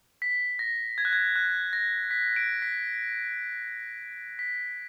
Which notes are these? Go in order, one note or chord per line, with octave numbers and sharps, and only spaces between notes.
B6
A#6
G#6
F#6
G#6
F#6
A#6
B6
D7
B6
B6